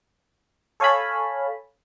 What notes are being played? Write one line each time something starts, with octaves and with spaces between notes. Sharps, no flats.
A4 C#5 F5 G#5 A5 B5